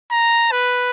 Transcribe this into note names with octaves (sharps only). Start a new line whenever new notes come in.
A#5
B4